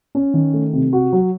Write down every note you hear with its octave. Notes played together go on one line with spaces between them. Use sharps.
C#4
D#3
A3
C3
F#4
F#3